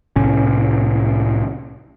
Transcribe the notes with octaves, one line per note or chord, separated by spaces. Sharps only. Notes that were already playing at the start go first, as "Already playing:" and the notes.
C2 A2 C#4